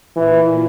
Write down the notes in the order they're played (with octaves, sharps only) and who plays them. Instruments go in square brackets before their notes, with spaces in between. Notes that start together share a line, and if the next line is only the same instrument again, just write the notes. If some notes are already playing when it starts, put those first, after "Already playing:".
[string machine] A#2 [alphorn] E3